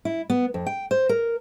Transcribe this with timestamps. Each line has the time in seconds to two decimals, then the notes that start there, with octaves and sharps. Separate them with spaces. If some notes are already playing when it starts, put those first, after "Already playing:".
0.05 E4
0.30 B3
0.54 F2
0.67 G5
0.91 C5
1.09 A#4